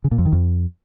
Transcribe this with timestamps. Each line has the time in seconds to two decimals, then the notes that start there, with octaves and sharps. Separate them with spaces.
0.04 C#3
0.11 A#2
0.18 F2
0.26 D#3
0.33 F2